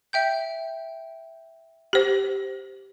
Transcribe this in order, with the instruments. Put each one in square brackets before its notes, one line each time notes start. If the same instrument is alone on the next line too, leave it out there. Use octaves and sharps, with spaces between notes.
[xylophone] E5 G5 G6
[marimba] G4 C5